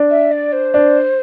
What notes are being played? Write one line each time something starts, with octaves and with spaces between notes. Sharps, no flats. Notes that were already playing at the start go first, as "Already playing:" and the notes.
Already playing: D4
E5
D5
C5
D4